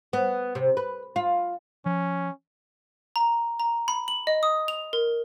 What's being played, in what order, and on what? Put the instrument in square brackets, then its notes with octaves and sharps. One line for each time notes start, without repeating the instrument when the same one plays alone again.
[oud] B3
C3
B4
F4
[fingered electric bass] F3 [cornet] C#4
[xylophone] A#5
A#5
B5
F#7
D#5
D#6
F7
A#4